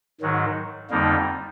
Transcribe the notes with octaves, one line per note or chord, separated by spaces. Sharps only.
G#2 D#3 F#3
F2 D3 G3 A#3 D#4